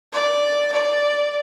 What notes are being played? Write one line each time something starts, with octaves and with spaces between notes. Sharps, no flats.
D5
D5